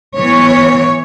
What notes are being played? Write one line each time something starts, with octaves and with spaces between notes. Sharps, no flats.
E3 B3 C#5